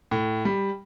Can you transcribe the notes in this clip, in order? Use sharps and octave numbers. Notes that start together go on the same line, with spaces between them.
A2
G3